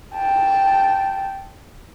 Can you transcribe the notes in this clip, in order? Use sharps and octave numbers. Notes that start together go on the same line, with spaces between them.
G5 A5